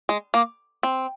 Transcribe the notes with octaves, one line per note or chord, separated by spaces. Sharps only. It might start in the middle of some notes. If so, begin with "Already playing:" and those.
G#3
A#3
C4